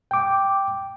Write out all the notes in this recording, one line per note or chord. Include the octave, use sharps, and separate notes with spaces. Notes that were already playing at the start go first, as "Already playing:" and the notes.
G5 D6